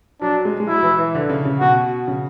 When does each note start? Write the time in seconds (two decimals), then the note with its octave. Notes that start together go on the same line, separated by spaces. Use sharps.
0.21 F#3 D4
0.45 G#3
0.60 G#3
0.67 F#3 E4
0.83 E3
0.98 E3
1.15 D3
1.29 C#3
1.45 C#3
1.60 B2 F#4
2.08 C#3